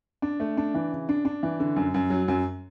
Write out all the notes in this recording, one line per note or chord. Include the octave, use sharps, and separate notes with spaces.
D4
A3
D4
E3
C#3
D4
D4
E3
D3
F#2
F#2
F#3
F#2